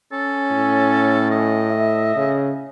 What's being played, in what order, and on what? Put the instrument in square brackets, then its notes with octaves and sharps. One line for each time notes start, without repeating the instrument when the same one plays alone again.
[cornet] C#4 [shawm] A4
[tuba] A2
[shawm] D#5
[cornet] E5
[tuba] C#3